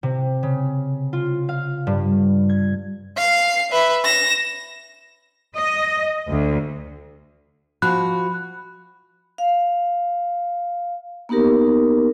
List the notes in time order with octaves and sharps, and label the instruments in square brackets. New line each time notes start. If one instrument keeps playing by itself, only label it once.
[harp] C3
C#3
F4
F5
G2
G#6
[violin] F5 C7
B4 E5
A#6 E7
[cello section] D#5
D2
[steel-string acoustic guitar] F3 F#4 [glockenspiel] B5 F#6
[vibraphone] F5
A#3 B3 D#4 G4 A#4